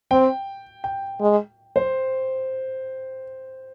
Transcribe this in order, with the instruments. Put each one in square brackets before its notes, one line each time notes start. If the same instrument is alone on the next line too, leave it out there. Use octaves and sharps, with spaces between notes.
[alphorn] C4 [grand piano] G5
[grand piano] G5
[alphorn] G#3
[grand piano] C5